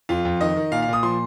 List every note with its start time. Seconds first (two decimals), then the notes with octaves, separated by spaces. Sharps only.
0.09 F2 F4
0.25 F2
0.41 D#3 D#5
0.57 D#3
0.72 A#2 F5
0.82 F5
0.88 A#2 D#6
1.03 F3 C6